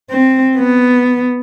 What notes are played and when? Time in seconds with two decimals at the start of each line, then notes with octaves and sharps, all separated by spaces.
0.11 C4
0.58 B3